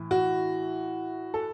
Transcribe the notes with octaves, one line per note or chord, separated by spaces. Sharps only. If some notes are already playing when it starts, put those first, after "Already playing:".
Already playing: A2 E3
F#4
A4